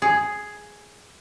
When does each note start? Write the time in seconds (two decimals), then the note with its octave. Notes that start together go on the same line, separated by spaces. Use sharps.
0.02 G#4